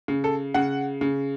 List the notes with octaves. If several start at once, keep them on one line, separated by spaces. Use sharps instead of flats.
C#3
A4
C#3 F#5
C#3